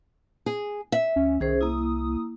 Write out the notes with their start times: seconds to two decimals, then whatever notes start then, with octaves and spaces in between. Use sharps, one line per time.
0.46 G#4
0.92 E5
1.16 D2 C#4
1.40 C2 D#3 C#4 G#4 C5
1.61 A#3 E4 D#6